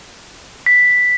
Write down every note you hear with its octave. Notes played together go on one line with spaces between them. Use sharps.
B6